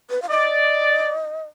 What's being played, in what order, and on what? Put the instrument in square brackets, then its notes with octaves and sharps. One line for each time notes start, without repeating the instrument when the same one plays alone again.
[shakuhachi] B4
F5
[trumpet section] D5 [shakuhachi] D#5